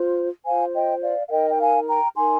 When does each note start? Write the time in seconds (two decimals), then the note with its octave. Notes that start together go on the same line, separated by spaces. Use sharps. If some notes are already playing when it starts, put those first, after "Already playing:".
Already playing: F4 C5
0.45 F4 C5 F5 G#5
0.74 D#5 G5
1.02 D5 F5
1.27 F5
1.30 D#4 A#4 D#5 G5
1.49 G5
1.60 F5 G#5
1.88 G5 A#5
2.17 D#4 A#4 G#5 C6